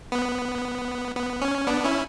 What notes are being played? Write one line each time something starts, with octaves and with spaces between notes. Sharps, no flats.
B3
B3
C#4
B3 D4
C#4 E4